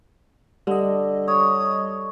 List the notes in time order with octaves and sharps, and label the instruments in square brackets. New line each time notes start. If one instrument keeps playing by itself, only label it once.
[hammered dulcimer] D3 [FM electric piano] G3 D#5
[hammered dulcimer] C#5 [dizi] D#6